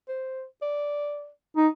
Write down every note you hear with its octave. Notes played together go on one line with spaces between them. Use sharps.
C5
D5
D#4